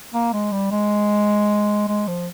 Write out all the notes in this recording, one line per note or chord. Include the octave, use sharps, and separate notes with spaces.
A#3
G#3
G3
G#3
G#3
F3